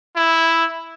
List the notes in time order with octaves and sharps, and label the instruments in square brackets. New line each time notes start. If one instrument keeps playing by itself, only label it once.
[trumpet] E4